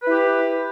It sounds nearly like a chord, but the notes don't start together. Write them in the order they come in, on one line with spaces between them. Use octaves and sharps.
B4 E4 G4